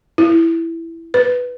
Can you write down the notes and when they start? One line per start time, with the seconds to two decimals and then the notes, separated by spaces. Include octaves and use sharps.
0.18 E4
1.14 B4